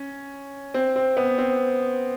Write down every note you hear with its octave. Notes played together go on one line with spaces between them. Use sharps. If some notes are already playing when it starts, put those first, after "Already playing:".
Already playing: C#4
C4
C4
B3
C4